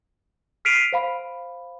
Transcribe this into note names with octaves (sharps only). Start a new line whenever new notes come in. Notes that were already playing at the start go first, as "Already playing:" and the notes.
F6 B6 C7 D7 D#7 F7
C5 F5 B5